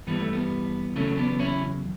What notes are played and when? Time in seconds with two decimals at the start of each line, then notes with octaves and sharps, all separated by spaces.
0.07 G2 E3 G3 B3
0.20 A3
0.33 B3
0.96 E2 C#3 F#3 A3 C#4
1.17 B3 D4
1.39 C#4 E4